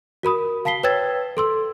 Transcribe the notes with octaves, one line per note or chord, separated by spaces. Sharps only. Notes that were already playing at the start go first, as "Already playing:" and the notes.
F#4 A#4 B5 D#6
F5 A5 B6 C7 G7
B4 C#5 G5 E6 G#6 A6
A4 C6 E6